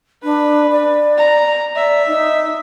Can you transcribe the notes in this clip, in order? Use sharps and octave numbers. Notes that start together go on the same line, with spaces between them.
D4 B4
D5
A#5
D5 E5
D#4